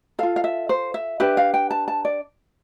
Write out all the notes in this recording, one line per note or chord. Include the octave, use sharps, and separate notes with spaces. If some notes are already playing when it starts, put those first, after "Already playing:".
F4 A4 F5
F5
E5
C5
E5
D4 G4 B4 E5
F5
G5
A5
A5
D5